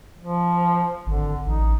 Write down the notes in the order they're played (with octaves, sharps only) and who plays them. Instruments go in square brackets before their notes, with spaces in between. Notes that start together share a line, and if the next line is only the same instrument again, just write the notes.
[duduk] F3
[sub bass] G#1 [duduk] D3
[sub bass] A1 [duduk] D#4